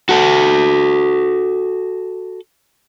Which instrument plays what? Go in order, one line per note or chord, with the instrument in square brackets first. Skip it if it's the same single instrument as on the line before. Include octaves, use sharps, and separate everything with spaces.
[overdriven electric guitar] F#4 A4